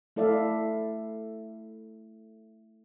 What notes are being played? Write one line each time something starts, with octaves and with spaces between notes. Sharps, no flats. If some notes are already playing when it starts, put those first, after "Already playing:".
A3 E4 A4 D5 E5 F5